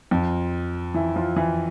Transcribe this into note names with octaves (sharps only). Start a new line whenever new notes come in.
F2 F3
E3 E4
F3 F4
E3 E4